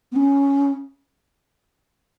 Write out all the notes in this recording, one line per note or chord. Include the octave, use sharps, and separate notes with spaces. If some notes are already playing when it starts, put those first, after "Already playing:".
B3
C#4